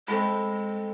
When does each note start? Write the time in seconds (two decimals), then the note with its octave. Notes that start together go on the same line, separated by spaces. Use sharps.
0.08 G#3 C4 A4 B5